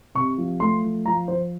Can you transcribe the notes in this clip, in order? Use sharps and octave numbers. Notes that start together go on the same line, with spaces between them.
C3 C#6
F3
A3 C6
F3
F3 A#5
F3 C5